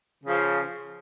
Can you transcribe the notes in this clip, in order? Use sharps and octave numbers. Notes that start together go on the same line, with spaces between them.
C#3 F3